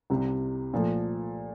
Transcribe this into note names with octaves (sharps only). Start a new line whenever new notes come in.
C2 C3 G3
A#2 F3 A3